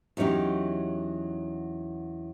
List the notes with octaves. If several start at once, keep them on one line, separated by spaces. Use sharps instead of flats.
E2 F#3 C#4 D#4 G4